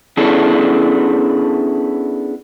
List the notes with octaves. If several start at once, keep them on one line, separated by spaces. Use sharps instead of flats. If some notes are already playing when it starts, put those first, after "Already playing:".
B3 C#4 D4 E4 G#4 A4